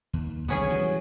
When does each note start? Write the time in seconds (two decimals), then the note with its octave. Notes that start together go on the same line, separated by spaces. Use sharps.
0.13 D#2
0.48 B1 D3 G#3 B3 C#4 G#4
0.70 E3 F#3 G3